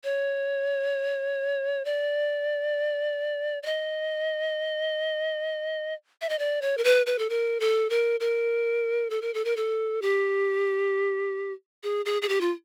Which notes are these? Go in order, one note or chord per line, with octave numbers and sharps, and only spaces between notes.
C#5
D5
D5
D#5
E5
D#5
D5
C#5
A#4
B4
B4
A4
A#4
A4
A#4
A#4
A4
A#4
A4
A#4
A4
G4
G#4
G#4
G#4
G4
F4